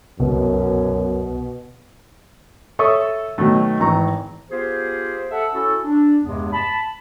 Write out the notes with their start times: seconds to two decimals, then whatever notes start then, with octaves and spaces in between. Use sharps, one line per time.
0.20 C2 F#2 B2
2.79 A4 C#5 E5 C#6 D#6
3.38 B2 D#3 F#3 A3
3.80 G#1 E3 A#5 C#6
4.50 B3 F4 G4 G#4 C5
5.31 A4 E5 F#5
5.53 C#4 E4 F#4 A4
5.83 D4
6.22 E2 G2 C3 G#3 B3
6.53 A5 B5